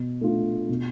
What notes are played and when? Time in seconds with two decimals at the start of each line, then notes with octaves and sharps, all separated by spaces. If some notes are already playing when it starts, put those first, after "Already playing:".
Already playing: B2
0.21 A3 D4 F4
0.69 B2